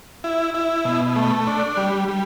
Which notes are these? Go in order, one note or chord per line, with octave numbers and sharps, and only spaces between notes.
E4
E4
B2
A3
D4
G3
G3